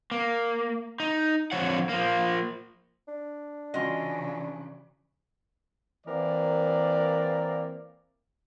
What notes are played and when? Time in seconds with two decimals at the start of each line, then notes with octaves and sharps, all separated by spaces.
0.11 A#3
1.00 D#4
1.52 F2 D3 D#3 F3 C#5 F#5
1.89 F3 A#3
3.08 D4
3.74 C#3 E3 C#4 F4 F#4 D#5 F#5
6.07 E3 A#3 C4 A#4 D5